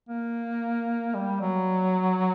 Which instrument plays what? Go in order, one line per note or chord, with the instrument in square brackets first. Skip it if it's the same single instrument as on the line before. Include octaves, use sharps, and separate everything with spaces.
[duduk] A#3
G3
F#3